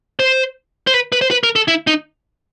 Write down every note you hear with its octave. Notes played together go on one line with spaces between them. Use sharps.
C5
C5
B4
B4
C5
B4
A#4
A4
E4
D#4